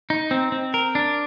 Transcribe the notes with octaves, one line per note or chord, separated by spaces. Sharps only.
D#4
C4
C4
A#4
D4